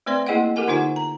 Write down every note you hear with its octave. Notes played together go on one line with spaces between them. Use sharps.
A3 C4 B4 C5 D5 C6
A#3 E4 G#4 D#5 F#5 G5
G4 A4 A#4 F#5 G#5
D3 D#4 F4 C5 F#5 G#5
A#5